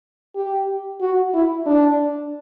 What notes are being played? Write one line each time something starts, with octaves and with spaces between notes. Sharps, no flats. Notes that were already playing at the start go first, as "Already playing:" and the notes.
G4
F#4
E4
D4